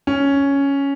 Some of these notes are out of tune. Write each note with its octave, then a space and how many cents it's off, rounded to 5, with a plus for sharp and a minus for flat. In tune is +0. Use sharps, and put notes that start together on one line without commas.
C#4 +5